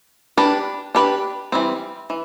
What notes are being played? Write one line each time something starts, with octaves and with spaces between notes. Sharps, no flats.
D4 G4 B4
D4 G4 B4
E3 G3 C4
E3